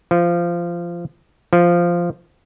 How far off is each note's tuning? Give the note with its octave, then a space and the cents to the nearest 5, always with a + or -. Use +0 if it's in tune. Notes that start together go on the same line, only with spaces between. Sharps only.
F3 -15
F3 -5